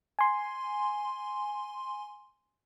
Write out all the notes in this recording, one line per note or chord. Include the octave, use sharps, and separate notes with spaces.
G#5 C6